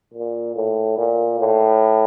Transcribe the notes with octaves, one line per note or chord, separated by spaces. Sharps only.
A#2
A2
A#2
A2